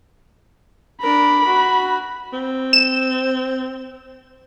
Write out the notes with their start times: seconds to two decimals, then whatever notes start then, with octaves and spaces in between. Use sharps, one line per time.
1.02 D4 A#4 B5
1.47 F#4
2.33 C4
2.73 E7